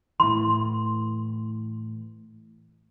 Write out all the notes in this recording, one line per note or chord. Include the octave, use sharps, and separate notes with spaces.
A2 E3 C6